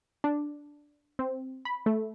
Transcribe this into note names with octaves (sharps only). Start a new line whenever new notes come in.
D4
C4
B5
A3